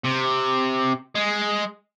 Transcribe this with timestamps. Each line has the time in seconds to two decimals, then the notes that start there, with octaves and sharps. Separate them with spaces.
0.04 C3
1.15 G#3